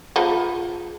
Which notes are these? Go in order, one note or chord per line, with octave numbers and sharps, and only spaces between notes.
F3 B3 D#4 F4 G#4